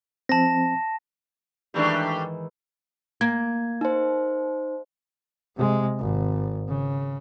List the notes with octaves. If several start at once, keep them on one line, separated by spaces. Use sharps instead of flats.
F3 C4 A5 A#6
G#2 D#3 E3 G3 A3 D4
A#3 G#6
D#4 C5
C3 G#3
G#1
C#3